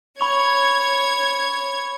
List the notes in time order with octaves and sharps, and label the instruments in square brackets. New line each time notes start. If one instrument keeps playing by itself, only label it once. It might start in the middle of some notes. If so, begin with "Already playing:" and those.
[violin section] C#5 G#6 [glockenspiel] B5 C#6 F7